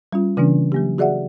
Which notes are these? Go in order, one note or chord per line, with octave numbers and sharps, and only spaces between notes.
G3 C#4 F4
C#3 E3 A#3 C#4 D4
F#3 A#3 G4
F#4 G#4 D5 E5 F#5